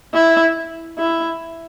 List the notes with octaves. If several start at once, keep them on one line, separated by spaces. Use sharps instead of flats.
E4
E4